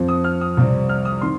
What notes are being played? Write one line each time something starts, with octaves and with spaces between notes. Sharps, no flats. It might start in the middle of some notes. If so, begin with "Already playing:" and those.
Already playing: F2 F3 C4 C5
D#6
F6
D#6
C2 C3 G3 C4
F6
D#6
D#3 C4 C6